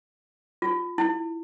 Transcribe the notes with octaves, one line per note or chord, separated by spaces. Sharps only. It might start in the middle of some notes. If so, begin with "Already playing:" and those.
F4
E4